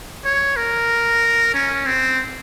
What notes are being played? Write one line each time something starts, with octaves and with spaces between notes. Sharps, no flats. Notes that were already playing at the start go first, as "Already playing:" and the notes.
C#5
A#4
C#4
C4